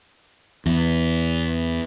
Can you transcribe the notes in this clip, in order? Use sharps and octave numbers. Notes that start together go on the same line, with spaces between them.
E2